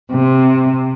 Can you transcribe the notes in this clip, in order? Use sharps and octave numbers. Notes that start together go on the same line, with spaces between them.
C3